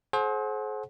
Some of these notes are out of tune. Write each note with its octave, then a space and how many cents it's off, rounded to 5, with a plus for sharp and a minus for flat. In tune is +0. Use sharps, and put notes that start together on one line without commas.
G#4 +45 C5 +25 F#5 +0